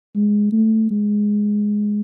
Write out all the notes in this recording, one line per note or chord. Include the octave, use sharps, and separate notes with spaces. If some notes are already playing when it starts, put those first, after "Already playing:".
G#3
A3
G#3